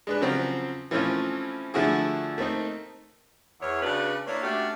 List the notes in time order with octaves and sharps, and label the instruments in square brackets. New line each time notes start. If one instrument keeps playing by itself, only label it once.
[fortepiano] G#3 D4 B4
C#3 F3 F#3 C4
E3 F3 A3 C4 C#4 F4
D3 F3 A3 E4 F#4 G#4
A3 A#3 C4 D#4
[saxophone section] E2 C#5
C#3 D4 F#4 B4
A#3 D4 E4 C#5
A3 C#4 D4 F#4 G4